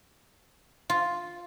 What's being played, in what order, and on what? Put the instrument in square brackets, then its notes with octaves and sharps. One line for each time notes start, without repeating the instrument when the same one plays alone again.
[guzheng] F4